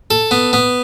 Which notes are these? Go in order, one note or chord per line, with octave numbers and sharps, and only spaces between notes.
A4
B3
B3